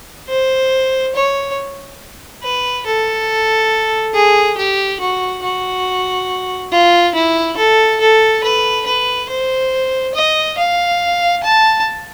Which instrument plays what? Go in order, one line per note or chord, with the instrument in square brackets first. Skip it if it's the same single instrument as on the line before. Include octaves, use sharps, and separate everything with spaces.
[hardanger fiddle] C5
C#5
B4
A4
G#4
G4
F#4
F#4
F4
E4
A4
A4
B4
B4
C5
D#5
F5
A5